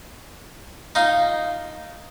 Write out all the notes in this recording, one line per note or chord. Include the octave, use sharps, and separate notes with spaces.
D#4 F4